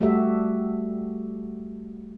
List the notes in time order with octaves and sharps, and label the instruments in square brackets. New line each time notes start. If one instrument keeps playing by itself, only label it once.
[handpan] G3 A3 F#4 G4 A4 E5